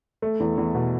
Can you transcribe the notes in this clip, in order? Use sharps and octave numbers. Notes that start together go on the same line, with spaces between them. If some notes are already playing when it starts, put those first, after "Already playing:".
A3
E2
E2
B2